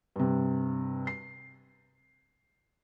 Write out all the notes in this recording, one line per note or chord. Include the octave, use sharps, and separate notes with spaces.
G2 C3
C7